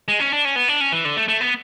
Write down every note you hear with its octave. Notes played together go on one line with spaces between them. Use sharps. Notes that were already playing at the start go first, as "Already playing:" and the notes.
G#3
C#4
D4
C#4
B3
D4
C#4
E3
D3
A3
A3
B3